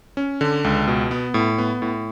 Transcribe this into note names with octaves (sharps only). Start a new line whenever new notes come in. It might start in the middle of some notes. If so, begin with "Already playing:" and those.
C#4
D3
C#2
B2
B3
A2
B3
A2